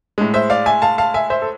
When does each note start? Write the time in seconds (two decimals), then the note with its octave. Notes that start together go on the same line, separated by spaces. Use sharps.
0.18 A2 G#3
0.34 C5 E5
0.50 D5 F5
0.66 E5 G#5
0.82 F5 A5
0.98 F5 A5
1.14 E5 G#5
1.30 C5 E5
1.42 A4